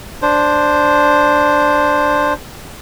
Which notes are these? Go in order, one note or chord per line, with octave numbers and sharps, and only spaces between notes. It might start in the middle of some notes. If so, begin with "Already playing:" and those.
D4 C5